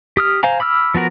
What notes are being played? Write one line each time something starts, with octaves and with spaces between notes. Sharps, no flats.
G4 D#6 F6
C5 F5 G#5 A#5
B5 D6 E6 F6
F3 B3 F#4 A#4